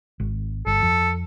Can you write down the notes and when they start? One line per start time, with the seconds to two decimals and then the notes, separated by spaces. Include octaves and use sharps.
0.20 G#1
0.66 G1 A4
0.82 F2